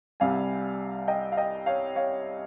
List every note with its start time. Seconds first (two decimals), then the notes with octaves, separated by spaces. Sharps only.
0.20 C2 C3 G3 F5 G#5
1.08 D#5 G5
1.32 F5
1.37 D#5 G5
1.66 C#5 F5
1.96 C#5 F5